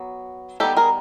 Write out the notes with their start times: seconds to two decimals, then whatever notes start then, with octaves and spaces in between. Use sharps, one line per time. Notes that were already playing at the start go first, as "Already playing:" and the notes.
Already playing: F#3 B3
0.60 D#3 G3 B3 G4 A4
0.77 G#4 A#4